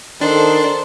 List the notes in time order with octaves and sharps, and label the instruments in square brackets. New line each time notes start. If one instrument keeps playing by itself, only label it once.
[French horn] D#3 [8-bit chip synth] D4 [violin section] A4 C5 [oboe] C6